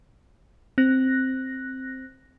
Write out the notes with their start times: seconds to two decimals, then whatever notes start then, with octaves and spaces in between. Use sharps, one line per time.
0.78 C4 F#6 A#6